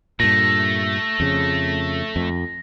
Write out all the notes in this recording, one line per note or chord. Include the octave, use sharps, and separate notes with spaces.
G2 A#2 A3 A#6
F2 C#3
F2